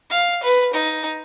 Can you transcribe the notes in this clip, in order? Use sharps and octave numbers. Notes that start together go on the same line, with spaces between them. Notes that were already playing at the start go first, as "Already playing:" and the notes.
F5
B4
D#4